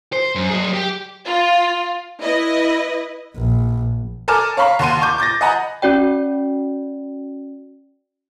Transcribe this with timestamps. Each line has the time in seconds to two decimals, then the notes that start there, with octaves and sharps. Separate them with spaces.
0.13 C5
0.35 F#2
0.50 F#3 G#4
0.73 G4 G5
1.25 F4
2.22 E4 B4 D#5
3.35 A#1
4.28 A4 A#4 G#5 A5 D6 F6
4.57 C#5 F5 A#5 B5 C#6
4.79 D#2 F#5 C6 D#7
5.02 C#6 D6 G6
5.18 D6 G6 A6 A#6
5.41 D#5 F#5 G#5 A#5 B5
5.82 C#4 F#4 D5 G5